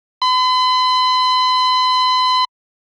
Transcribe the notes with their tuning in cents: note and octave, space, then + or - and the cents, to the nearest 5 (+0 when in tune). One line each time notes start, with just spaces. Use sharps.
B5 +45